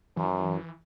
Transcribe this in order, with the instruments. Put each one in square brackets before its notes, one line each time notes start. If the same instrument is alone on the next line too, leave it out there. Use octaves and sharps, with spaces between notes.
[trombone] F#2 [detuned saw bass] E3